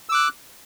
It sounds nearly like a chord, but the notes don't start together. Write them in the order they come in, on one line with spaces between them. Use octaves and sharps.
E6 D6 F#6